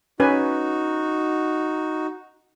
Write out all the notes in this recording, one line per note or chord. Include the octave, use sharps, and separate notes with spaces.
C#4 D#4 F#4 B4 G#5